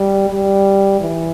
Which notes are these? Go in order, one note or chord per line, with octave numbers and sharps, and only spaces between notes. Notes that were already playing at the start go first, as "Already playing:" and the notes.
Already playing: G3
G3
E3